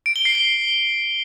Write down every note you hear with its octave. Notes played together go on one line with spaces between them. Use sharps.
D7
G7
C7
G7